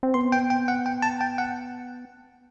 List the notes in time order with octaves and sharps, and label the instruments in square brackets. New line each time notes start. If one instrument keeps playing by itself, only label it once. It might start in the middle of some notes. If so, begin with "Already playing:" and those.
[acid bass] C4
[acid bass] B3 [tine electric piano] C6
[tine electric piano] G5
G5
F#5
G5
A5
G5
F#5